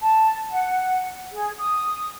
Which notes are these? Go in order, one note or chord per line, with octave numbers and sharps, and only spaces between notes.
A5
F#5
G#4
D#6